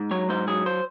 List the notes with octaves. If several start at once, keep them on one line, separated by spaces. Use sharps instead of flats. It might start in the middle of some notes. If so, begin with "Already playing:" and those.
Already playing: G#2
F#3 C#5
G#2 C5
F#3 G#4
C5